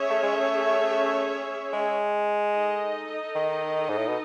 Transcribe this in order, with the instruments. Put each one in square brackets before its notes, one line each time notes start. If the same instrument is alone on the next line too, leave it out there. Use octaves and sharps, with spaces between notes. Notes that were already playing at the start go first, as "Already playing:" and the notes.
Already playing: [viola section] C#4 G#4 C#5 E5
[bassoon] A3
G#3
A3
G#3
[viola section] D#4 A4 D#5
[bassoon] D#3
G#2
A2
B2